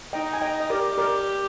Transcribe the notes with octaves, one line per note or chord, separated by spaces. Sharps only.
D#4 D#5 G5
G#5
D#4 D#5 G5
D#5
G4 A#4 D5
A#4 D5